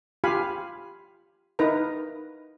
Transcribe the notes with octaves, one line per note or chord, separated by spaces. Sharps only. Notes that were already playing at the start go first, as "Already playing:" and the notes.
F4 G4 F5 G#5 B5
D#4 E4 A#4 B4 A#5